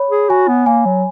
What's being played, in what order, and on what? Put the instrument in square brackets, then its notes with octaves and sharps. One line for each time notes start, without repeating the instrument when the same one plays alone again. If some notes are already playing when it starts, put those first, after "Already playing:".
Already playing: [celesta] C#5 B5
[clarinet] G#4
[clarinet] F#4 [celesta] G#5
[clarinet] B3
[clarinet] A#3 [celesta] G#5
[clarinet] F#3